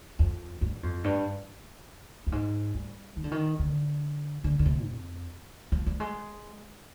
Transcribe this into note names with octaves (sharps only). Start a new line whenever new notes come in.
F2
G2
F2
G2
G2
G#2
G3
D#3
D3
D#3
D3
D3
D3
C3
F2
F3
G3
G#3